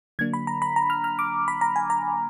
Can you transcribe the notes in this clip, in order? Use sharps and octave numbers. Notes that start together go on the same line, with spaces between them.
D3 F#3 A#3 D4 G#6
B5
A#5
B5
A#5
F6
F6
D6
B5
A#5
G#5
A#5